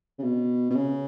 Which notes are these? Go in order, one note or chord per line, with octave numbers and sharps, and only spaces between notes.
C#3
B2
B2
C#3